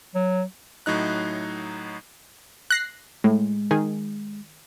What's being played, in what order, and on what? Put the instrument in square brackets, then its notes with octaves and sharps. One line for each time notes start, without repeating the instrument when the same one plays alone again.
[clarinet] F#3
[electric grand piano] A2 F#3 D#4 F#6
[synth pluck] F#6 A#6 C7
[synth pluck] A2 [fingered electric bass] G#3
[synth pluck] D#3 G#4